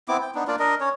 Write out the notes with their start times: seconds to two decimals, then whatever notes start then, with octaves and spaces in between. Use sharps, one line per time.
0.08 B3 C4 E4 D6
0.21 G5
0.35 B3 D4 D#4
0.48 A#3 D4 F4 D5
0.59 D4 A#4 D#5
0.81 C#4 C#5